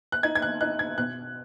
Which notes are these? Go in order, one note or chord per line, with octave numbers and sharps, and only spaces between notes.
F#6
D#4 G#6
G#6
F#6
D#4 F#6
G#6
B2 F#6